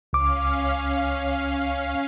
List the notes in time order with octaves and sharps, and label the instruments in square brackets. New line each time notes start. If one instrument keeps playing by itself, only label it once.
[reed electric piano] C#2 D6 [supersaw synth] C#4 F5